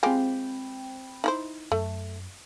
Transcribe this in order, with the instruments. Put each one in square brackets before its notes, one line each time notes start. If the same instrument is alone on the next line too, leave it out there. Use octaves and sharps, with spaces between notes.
[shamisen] G#3 F4 G4 [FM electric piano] C4 G5 B5
[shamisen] D#4 E4 C5
[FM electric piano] F#2 [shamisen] A3